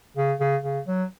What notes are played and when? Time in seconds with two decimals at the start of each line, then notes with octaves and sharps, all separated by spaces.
0.17 C#3
0.40 C#3
0.63 C#3
0.88 F#3